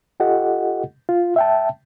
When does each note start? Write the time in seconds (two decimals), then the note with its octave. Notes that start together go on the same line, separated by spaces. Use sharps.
0.20 F4 G4 A4 D#5 F#5
1.09 F4
1.36 E5 G5 A5